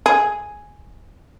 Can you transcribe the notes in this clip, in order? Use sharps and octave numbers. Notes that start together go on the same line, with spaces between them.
G#4